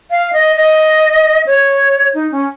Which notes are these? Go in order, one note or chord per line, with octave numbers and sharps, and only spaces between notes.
F5
D#5
D#5
C#5
D#4
C#4